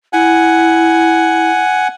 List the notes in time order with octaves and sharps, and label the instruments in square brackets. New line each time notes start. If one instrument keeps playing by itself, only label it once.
[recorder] E4 [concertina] F#5 G#5